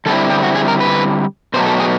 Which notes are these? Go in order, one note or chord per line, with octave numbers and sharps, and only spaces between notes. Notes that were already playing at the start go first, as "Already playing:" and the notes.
D3 G3 C4 E4 A4
G4
F#4
G#4
A#4
B4
B2 F#3 A3 C5
A4
G#4